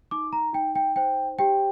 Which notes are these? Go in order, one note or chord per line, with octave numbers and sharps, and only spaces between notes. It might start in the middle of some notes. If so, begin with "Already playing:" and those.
D#4 D6
A#5
D#4 G5
G5
C5 G5
G4 G5